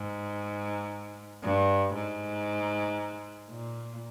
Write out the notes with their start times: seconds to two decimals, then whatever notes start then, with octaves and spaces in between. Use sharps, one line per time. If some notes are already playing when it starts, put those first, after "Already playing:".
Already playing: G#2
1.43 G2
1.94 G#2
3.50 A#2